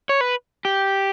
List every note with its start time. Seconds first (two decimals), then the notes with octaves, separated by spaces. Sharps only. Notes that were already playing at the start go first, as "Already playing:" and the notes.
0.09 C#5
0.21 B4
0.65 G4